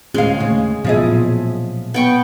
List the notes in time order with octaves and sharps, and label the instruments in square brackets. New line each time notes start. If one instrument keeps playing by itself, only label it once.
[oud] D2 F5 [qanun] G#3 [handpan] C#4
[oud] D#2 C#3
[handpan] B2 F#3 E5 [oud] F3 G#4 D#5
[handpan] A#2
[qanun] B3 G5 C#6